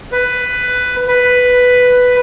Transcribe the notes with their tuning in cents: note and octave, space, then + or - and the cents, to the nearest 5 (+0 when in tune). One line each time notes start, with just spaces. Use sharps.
B4 +10
B4 +5